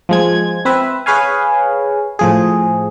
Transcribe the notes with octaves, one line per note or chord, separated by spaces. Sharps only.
F3 G#3 G#6
C4 B4 E5
G#4 B4 C#5 F5 G#5
A2 F3 G#4